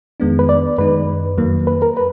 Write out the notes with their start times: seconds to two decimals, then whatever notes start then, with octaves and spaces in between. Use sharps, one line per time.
0.20 F2 D#3 G#3 B3 D4
0.39 B4
0.49 D5
0.78 F#2 D#3 G#3 D#4 B4
1.38 F2 D#3 F#3 A#3
1.67 B4
1.82 A#4
1.97 B4